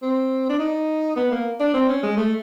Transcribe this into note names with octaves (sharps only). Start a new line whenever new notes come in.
C4
D4
D#4
B3
A#3
D4
C4
C#4
G#3
A3